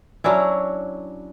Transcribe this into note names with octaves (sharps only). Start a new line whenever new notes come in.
F#3 C#4 D4 E4